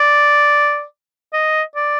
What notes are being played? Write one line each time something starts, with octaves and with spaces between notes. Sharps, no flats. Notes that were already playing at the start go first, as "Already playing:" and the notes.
Already playing: D5
D#5
D5